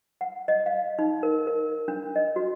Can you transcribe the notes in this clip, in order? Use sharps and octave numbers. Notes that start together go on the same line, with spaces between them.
F#5
D#5
F5
D#4
A#4
A#4
D4
D#5
F#4